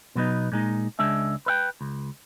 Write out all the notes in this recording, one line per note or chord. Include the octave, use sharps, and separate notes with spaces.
B2 F#3 B3 D#4
A#2 G#3 D#4
C#2 G#3 D4 E5
B4 E5 G5
C#2